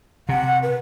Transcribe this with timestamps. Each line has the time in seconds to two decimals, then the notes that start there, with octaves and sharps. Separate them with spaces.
0.29 C3 F#5
0.63 B4